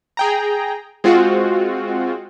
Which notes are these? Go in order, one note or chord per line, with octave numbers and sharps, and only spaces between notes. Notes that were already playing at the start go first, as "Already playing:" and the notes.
G#4 G5 A#5
G#3 C4 F4 F#4